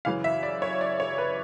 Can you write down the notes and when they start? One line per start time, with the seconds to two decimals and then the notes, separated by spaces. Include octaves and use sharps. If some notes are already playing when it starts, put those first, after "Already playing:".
0.05 F#2 C#3 E3 F5
0.24 E5
0.43 D5
0.62 C#5
0.81 D5
1.00 C#5
1.18 B4